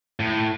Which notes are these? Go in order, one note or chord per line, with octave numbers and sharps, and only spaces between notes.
A2